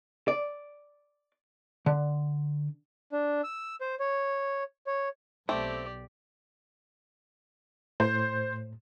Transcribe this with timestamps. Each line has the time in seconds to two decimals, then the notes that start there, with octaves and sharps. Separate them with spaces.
0.28 D5
1.86 D3
3.12 D4
3.44 E6
3.81 C5
4.00 C#5
4.87 C#5
5.49 B1 A3 C4 G4 D5
8.00 A2 C5